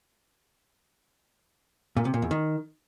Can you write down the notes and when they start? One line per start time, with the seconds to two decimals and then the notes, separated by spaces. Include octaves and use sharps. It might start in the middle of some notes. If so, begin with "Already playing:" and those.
1.97 A#2
2.05 C3
2.14 A#2
2.22 E2
2.31 D#3